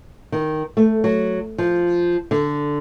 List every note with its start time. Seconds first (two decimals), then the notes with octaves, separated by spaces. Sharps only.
0.32 D#3
0.77 A3
1.04 F#3
1.58 F3
2.31 D3